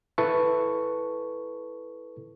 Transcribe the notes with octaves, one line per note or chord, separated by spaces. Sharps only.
E4 A4 B4 A5 C#6